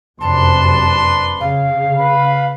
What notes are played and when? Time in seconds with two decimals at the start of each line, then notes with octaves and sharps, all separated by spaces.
0.21 F1 F#2 C3 D4 B4 A5 C6
1.40 C#3 F5
1.98 B4 B5